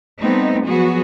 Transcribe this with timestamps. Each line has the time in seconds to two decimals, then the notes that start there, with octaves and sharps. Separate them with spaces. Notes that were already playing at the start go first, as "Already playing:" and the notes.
0.19 G3 A3 B3 C4 D#4
0.67 F3 F#3 B3 F#4 G#4